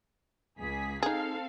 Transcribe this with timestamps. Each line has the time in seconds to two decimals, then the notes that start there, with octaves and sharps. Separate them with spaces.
0.58 C#2 G#4 B6
1.03 C4 D#4 G#4 A4 F5